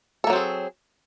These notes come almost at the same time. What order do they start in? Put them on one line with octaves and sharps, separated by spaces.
A4 A#3 F#3 C4 G#4